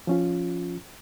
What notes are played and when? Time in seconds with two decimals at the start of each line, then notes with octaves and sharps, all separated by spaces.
0.07 F3 C#4 F4